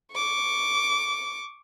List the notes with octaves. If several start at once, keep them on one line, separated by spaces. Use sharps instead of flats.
C#6 D6